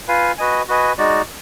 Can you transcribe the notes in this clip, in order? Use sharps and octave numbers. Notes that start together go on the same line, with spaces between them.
F4 B4 F5 G#5
F#4 B4 D#5 G#5
F#4 B4 D#5 G#5
G#3 D#4 F#4 D5